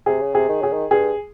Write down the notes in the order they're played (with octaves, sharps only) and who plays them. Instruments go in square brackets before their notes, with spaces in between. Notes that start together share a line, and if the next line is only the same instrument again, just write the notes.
[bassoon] C3 [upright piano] G#4
[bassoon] C#3
[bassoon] C3 [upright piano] G#4
[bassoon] D#3
[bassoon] C#3 [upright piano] G#4
[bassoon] D#3
[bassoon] G2 [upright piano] G#4